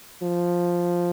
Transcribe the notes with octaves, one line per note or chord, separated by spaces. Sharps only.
F3